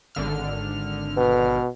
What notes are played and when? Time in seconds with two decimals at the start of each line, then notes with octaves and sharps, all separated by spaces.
0.15 G#1 D3 F6
1.17 B2 B4